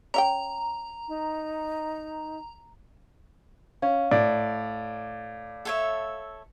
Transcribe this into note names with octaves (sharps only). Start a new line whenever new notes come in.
C#4 E5 G5 A#5
D#4
C#4 F5
A2 D5
A4 C#5 E5